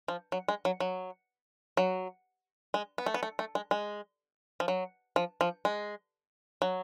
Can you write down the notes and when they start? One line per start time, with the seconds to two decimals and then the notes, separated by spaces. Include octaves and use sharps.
0.08 F3
0.32 F#3
0.48 G#3
0.65 F#3
0.80 F#3
1.77 F#3
2.74 G#3
2.98 B3
3.06 A3
3.14 B3
3.23 A3
3.39 A3
3.55 G#3
3.71 G#3
4.60 F3
4.68 F#3
5.16 F3
5.41 F3
5.65 G#3
6.62 F#3